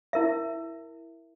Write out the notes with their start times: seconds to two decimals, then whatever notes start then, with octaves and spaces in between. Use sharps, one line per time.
0.13 E4 A#4 E5